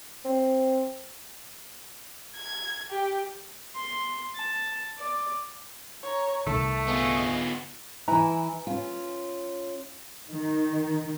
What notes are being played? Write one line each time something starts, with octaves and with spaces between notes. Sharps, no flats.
C4
G#6
G4
C6
A5
D5
C#5 A#5
C2 D#3 A3 A5
B3 F4 G#4 D#5
E3 E4 B4 G#5 A#5
C#4 F4
D#3